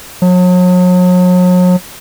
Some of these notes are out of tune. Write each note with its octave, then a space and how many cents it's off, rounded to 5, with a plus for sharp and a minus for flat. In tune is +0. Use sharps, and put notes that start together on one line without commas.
F#3 -40